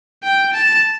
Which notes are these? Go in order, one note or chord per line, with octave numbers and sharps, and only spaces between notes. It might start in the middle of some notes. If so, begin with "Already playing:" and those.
G5
A5